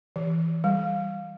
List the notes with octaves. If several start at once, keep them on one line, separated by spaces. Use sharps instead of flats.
E3
G3